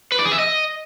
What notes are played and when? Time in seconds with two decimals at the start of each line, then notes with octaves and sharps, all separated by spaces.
0.12 B4
0.19 D5
0.25 G#4
0.32 E5
0.39 D#5